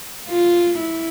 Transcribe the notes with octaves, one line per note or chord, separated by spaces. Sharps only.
F4
E4